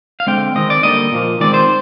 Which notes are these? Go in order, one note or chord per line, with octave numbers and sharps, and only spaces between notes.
F5
D3 G#3 C4 G5
D#3 G#3 C4 D#5
D5
D3 G3 A#3 D#5
A#2 F3 A#3
D#3 G#3 C4 D5
C5